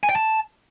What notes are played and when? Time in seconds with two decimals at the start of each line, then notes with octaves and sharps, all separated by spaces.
0.03 G#5
0.10 G5
0.16 A5